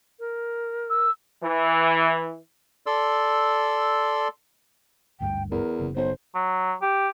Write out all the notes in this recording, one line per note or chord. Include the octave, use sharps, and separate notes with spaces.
A#4
E6
E3
A4 D5 C6 E6
G#1 D2 G2 G5
E2 A#4
F#1 C#3
B1 C5
F#3
G4